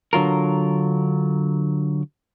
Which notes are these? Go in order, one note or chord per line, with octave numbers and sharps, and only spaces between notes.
D3 F#3 F4 A#4